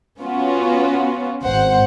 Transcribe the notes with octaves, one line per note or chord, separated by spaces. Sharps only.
B3 C#4 F4 F#4
G#1 C5 F#5